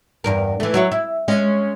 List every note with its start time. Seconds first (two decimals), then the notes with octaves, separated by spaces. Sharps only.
0.24 E2 G2 A#4
0.60 E3 A3
0.74 F#3 E4 C#5
0.92 E4
1.28 G#3 C#4 D#5